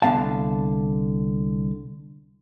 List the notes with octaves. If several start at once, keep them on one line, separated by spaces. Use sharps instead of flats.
C2 D3 B3 F5 A5